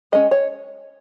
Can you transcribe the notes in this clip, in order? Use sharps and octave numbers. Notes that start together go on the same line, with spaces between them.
G#3 C#4 D#5
C#5